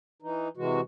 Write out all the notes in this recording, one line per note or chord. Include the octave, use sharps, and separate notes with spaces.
E3 D#4
C3 E3 G#3 F#4